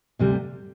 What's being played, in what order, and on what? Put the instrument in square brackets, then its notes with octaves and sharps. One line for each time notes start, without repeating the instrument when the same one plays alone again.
[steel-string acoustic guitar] D2 C3 G3